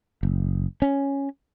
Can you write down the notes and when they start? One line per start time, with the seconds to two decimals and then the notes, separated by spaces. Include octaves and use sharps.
0.23 F#1
0.82 C#4